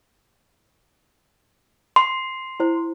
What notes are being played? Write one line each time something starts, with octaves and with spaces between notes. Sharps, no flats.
C6
E4 C5